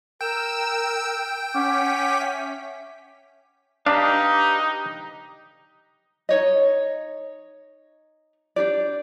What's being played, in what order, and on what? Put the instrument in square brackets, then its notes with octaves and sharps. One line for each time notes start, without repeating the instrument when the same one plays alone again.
[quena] A#4 [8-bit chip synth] G5 [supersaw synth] E6
[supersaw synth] C#4 B6 [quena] F#5 [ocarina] D6
[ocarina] E5
[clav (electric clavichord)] D4 [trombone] D#4 [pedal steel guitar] G4 B4 F5
[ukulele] D#4 C#5 D#5
D4 D#4 G4 D5